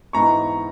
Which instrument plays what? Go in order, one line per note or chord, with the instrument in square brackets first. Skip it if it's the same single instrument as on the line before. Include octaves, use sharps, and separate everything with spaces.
[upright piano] G#2 E3 B3 D#4 A#5 C#6